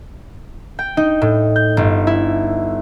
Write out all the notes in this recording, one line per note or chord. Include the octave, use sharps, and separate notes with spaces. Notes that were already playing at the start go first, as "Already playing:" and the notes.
G5
D#4
A2
G6
G1
E4